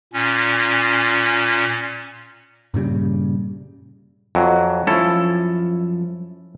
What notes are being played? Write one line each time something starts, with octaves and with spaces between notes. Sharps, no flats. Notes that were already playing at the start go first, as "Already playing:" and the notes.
A#2 C#4
G2 A#2 C#3 G3
F2 F#3
F#2 F3 C#4 E4 A4